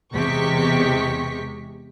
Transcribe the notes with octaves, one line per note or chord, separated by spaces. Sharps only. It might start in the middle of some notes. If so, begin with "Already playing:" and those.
E2 C3 G#3 G4 C#6 B6